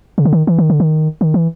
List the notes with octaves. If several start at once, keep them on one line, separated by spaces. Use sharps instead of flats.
C#3
D3
D#3
E3
D#3
D3
D#3
D#3
E3